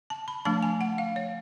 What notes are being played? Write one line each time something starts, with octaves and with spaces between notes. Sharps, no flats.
A5
B5
F3 A3 D4 A5
G#5
F#5
F5
C#5